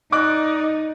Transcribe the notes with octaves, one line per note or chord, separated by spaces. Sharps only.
D#4 D5 D#5 D6 F#6